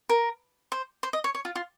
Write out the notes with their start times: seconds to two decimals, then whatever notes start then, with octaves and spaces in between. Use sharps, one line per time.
0.09 A#4
0.72 C5
1.03 C5
1.13 D#5
1.24 C#5
1.35 C#5
1.45 F4
1.55 F4